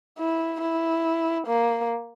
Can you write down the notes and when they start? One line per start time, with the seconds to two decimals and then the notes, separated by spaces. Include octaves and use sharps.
0.19 E4
0.61 E4
1.47 A#3